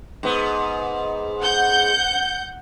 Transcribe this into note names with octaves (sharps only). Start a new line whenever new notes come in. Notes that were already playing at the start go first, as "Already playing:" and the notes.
G#2 B3
F#5 G6